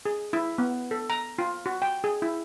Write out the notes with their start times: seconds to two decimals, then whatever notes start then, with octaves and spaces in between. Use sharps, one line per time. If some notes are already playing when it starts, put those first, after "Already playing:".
0.06 G#4
0.33 E4
0.58 B3
0.91 A4
1.10 A#5
1.39 F4
1.66 F#4
1.82 G5
2.04 G#4
2.22 E4